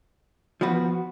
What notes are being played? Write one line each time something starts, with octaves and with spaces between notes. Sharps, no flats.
F3 B3 F#4 B4